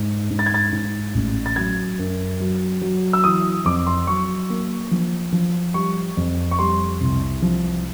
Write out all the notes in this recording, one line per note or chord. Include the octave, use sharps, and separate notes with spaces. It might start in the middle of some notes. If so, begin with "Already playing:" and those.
Already playing: G#2
G#2
A6
G#6
A6
G#2
A1
A6
F#3 G#6
F#2
F#3
F#3
E6
E3 D#6
F2 D6
C6
F#3 C#6
A#3
F3
F3
G3 C#6
F2
C#6
G3 C6
C2
F3